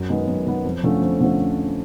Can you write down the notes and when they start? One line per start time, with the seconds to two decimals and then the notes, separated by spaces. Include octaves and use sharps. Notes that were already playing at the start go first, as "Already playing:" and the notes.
Already playing: F#2
0.10 D#3 G#3 B3
0.27 F#2
0.46 D#3 G#3 B3
0.65 F2
0.83 D3 F3 A3 C#4
1.01 F2
1.20 D3 F3 A3 C#4